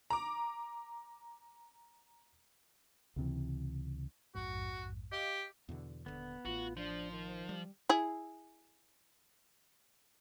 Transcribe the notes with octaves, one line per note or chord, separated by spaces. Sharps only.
A#5 D6
C#2 C3 E3
A#1 F2 G#2 F#4
G4 D#5 F5 D6
E2 B2 D3
D#1 G#1 D3 B3
A1 F4 F#4
F3 D4 C5
D#3
G3
E4 G#4